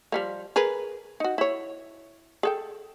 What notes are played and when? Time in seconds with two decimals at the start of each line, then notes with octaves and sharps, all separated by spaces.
0.12 F3 G3 A#3
0.56 G#4 A#4 B4
1.20 D#4 F#4
1.38 E4 C#5
2.43 G#4 A4 G5